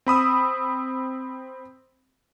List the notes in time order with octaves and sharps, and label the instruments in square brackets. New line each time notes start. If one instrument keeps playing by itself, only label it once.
[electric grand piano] C4 B5 D#6 E6